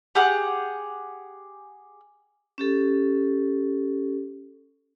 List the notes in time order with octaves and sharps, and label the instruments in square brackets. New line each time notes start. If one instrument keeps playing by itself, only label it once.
[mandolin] G4 G#4 F#5
[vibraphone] C#4 G4 A4